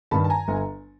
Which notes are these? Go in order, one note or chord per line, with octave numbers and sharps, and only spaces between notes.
G2 D#3 A5 B5
A5
G#5 A#5
G1